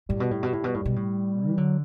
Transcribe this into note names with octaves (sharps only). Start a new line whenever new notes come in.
A2 G3
B2
A2
B2
A2
B2
A2
B2
A2
E3
D3 F#3